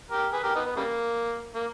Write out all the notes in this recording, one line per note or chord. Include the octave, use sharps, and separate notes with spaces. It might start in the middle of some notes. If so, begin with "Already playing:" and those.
G4 A#4
G#4 B4
G4 A#4
B3 D#4
B3
C#3 G3 A#3
A#3